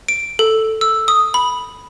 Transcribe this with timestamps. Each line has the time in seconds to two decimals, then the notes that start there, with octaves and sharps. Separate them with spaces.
0.09 D7
0.39 A4
0.81 E6
1.08 D#6
1.34 B5